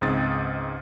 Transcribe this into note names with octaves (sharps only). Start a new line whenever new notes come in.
C#2 G#2 C4 D#6 A6